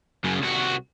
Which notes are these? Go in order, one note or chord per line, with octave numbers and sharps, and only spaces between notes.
F#2 C#3
C2 F#4